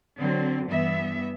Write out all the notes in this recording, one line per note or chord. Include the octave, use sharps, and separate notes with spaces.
D3 F#3 C4
G2 E3 B3 E5